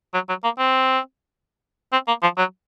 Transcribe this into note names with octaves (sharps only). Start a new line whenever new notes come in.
F#3
F#3
A#3
C4
C4
A#3
F3
F#3